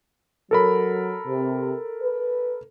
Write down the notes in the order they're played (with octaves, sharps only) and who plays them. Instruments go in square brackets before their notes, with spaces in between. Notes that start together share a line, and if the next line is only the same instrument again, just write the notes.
[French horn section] F#3 [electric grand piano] A4 A#4 B5
[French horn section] C3
B4